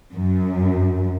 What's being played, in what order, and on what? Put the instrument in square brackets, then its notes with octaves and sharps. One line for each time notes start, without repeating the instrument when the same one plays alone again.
[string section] F#2